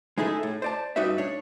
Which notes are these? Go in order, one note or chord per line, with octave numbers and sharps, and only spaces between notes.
G#3 D#4 E4 G#4 A4
A2
C5 D5 A5
G2 G3 D#4 F#4 B4 E5
D4 C#5